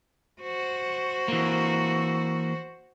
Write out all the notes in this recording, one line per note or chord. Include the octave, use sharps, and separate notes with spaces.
F#4 C5
E3 A#3